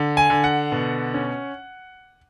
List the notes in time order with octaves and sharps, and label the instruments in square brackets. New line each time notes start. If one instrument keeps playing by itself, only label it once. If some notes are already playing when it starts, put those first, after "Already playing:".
Already playing: [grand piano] D3
G#5
D3
F#5
B2
C#4